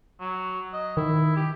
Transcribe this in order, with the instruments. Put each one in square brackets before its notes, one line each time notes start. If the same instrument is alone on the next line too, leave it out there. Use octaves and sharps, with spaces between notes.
[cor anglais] F#3
D#5
[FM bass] D#3 [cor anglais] E4
[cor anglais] G4